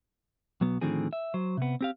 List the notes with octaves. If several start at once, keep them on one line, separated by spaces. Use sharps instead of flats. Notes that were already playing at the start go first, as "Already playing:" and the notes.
B1 F#3 B3
A2 D3 D#3 F3 C4 G#4
E5
F#3 C5
C3 B3
C4 G4 F5